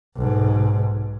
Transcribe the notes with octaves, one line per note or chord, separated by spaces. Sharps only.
B1 G#2